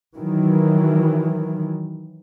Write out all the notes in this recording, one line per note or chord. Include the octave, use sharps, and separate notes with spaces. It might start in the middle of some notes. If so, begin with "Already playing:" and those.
D#3 E3 F#3